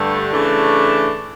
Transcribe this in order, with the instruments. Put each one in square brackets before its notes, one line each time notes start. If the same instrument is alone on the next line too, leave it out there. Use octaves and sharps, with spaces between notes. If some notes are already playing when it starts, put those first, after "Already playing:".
Already playing: [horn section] G2 D3 A3
C#3 E3 A3 D4